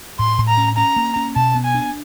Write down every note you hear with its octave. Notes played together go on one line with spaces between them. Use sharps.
A2 C6
A2
A#5
C#4
C#4 A#5
A#3
C#4
B2 A5
B3
G#5
D4